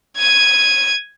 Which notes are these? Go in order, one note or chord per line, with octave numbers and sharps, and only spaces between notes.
G#6 D#7